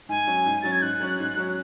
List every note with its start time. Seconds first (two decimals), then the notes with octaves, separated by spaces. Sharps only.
0.09 G#2 G#5
0.27 F#3 C#4
0.46 G#2
0.62 F#3 C#4 A6
0.72 G#6
0.82 G#2 F#6
1.00 F#3 C#4
1.19 G#2
1.37 F#3 C#4